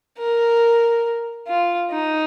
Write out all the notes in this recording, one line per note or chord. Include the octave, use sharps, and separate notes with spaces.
A#4
F4
D#4